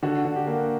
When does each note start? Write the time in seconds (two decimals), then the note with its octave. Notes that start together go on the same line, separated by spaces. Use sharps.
0.03 D3 F#4
0.25 D3
0.36 G4
0.47 A#3